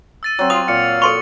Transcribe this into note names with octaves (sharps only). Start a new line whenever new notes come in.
E6 A6 D#7
F#3 C4
F4 D#6 F7
A#2 F5 C#7
A4 C6 C#6 F7